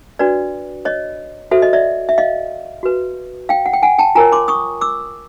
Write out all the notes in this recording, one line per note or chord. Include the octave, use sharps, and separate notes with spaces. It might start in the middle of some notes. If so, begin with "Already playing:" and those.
D4 F#4 B4 D5
C#5 D#5
F#4 A4 C5 E5
D#5
D5 E5
E5
D#5 F5
F#4 B4
F5 G5
F#5
G5
F#5 G#5
G5 A5
F4 A#4 C#5 G#5 A#5
C6 D6
C#6 D#6
D6 E6